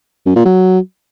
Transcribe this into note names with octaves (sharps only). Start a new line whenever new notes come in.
F#2
A#2
F#3